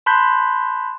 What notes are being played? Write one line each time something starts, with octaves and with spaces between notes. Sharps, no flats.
A5 B5 C6 F#6 G6 B6